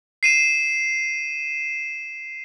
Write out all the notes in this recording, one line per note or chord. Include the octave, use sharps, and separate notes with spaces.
C7 D#7 E7